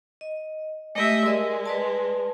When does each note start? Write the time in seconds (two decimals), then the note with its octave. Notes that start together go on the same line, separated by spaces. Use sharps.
0.21 D#5
0.95 G#3 A3 G4 D#5 E5
1.26 G#3 A#4 D5 D#5
1.66 B4 D5 A5